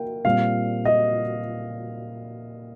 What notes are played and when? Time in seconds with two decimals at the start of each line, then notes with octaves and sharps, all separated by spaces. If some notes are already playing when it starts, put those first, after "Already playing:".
Already playing: A#3 G5
0.25 A#2 G3 C4 F5
0.85 D#5